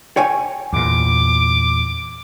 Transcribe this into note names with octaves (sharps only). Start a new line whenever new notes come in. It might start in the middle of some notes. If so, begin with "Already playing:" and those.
C#5 G5 G#5
E2 A#2 D6